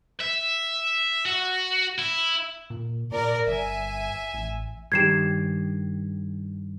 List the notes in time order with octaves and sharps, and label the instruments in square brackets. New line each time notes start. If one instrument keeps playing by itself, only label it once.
[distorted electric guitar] E5
F#4
E4
[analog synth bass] A#2
[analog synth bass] A#2 [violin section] A#4 D5
[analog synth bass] G1 [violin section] E5 G#5
[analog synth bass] A1
[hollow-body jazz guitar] G2 D#3 G4 [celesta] G#6 C7 E7